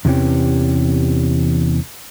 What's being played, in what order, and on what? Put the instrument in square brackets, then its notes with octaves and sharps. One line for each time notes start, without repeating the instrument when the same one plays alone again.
[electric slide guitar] E2 C3 E3 C#4 G4